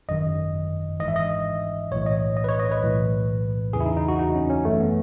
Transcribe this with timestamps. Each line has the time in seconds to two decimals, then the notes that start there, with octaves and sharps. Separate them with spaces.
0.09 G#1 F#2 D#3 D#5
1.00 G#1 G#2 E3 D#5
1.08 E5
1.16 D#5
1.91 B1 A2 E3 C#5
2.06 D#5
2.37 D#5
2.44 B4
2.49 C#5
2.60 D#5
2.71 B4
2.83 B1 A2 E3
3.73 E2 C#3 E3 G#4
3.80 E4
3.86 D#4
3.97 D#4
4.08 F#4
4.19 D#4
4.35 C#4
4.50 C#4
4.65 G#1 F#2 E3 A3
4.80 B3